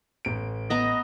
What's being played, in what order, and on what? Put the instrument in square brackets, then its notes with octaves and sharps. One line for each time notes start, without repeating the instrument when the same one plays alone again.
[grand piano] A1 D7
[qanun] B3 A#5 [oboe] D#5